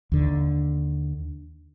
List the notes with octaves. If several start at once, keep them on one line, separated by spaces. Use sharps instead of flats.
D#2 D3